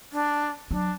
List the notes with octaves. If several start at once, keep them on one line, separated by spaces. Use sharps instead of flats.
D4
F#3 D4